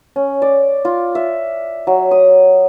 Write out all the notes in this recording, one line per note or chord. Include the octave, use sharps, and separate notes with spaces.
C#4
D5
F4
E5
F#3
D#6